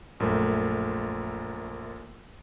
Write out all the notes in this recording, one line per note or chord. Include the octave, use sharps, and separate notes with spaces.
A#1 F#2 A3